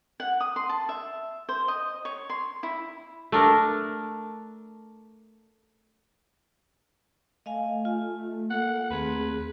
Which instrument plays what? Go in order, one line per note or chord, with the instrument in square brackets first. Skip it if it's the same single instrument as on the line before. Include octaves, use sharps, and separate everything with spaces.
[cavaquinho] F#5
D#6
C6
A5
E5
C5
D#5
C#5
C6
E4
[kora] A3 D4 A#4
[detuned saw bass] A3 [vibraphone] D#5 F5 G#5
[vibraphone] F4
[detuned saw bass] A#3 [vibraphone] A4 [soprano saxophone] F#5
[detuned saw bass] D#2 [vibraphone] A3 C4 G#4 [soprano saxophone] B4